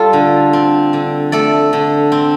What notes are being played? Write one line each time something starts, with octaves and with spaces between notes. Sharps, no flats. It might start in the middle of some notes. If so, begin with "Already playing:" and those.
Already playing: G3 F4 A4
D3
C4
D3
A3 A4 D5
D3
C4